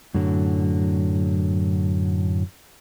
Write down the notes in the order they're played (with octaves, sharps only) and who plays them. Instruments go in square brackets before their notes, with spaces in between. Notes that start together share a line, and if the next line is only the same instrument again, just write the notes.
[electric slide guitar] F#2 A2 D3 F#3